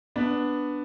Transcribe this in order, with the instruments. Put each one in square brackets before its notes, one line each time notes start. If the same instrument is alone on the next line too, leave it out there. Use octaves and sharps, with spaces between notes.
[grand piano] B3 D4